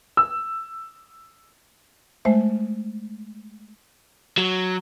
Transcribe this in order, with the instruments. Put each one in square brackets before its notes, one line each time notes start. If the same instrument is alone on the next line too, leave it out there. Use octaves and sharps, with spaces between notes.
[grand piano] E6
[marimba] G#3 A3 C5 E5
[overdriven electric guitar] F#3